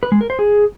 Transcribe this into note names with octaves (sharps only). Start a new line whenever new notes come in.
B4
G#3
A#4
C5
G#4